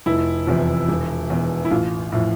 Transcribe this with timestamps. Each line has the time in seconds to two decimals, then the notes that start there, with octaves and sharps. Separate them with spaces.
0.06 F1 E4
0.47 E2 C3 F3
0.88 E1
1.30 E2 B2
1.65 E4
1.71 A1 F4
2.12 A2 F3